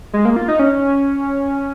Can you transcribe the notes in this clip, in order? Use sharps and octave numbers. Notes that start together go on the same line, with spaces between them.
G#3
A#3
F4
D#4
C#4